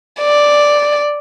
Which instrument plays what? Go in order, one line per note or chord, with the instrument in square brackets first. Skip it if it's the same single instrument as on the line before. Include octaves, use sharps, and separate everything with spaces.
[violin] D5